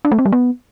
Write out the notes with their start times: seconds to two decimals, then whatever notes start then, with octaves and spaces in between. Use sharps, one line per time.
0.05 D4
0.12 A3
0.19 C4
0.26 G3
0.32 B3